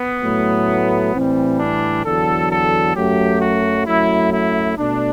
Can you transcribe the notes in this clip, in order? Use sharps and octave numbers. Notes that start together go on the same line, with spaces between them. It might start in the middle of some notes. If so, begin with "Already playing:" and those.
Already playing: B3
A2 F#3 A3
A2 E3 G3 C4
D4
E2 D3 F#3 A4
A4
F#2 F#3 A3 G4
F#4
F#2 F#3 A3 E4
E4
B2 A3 D4